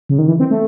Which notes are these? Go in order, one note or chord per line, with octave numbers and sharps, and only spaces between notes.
C#3
D#3
E3
C4
A3